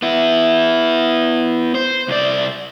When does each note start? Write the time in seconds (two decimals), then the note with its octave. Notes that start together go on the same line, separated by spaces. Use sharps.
0.02 B3 E4
1.75 C5
2.08 C2 D5